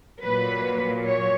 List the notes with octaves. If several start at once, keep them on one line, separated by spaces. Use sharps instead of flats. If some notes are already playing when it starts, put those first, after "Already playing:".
A#2 F#3 B4
C#5